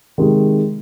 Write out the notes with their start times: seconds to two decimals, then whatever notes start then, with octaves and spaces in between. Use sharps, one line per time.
0.18 C3 D#3 G#3